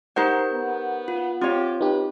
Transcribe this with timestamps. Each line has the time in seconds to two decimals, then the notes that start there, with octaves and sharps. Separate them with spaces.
0.16 D#4 G4 A#4 C5 F#5 G6
0.53 B3
1.08 F4
1.41 C4 F4 G4 C#5
1.81 D#4 G4 B4